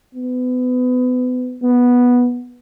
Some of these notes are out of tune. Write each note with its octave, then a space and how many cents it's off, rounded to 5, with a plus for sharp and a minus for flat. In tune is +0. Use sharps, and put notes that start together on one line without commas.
B3 +30
B3 -10